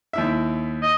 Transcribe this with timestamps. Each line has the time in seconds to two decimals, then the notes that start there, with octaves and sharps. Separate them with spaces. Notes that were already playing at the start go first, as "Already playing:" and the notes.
0.13 D#2 E4 E5
0.82 D#5